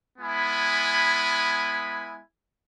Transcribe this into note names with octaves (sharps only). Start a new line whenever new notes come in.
G#3 B3 E4 G#5 B5